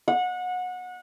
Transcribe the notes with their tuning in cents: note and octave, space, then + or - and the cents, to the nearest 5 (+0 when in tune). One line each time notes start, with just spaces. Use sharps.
F#5 -25